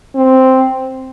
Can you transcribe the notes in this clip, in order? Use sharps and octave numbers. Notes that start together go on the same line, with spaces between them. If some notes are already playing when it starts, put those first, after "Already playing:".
C4